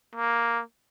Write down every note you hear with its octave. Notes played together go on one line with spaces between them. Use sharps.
A#3